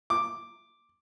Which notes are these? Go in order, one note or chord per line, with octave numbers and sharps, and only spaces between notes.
D6